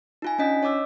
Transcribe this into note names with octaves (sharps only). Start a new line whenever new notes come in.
D#4 F4 G#5
C#4 D4 D#5 B6
C#5 D#5 D6 E6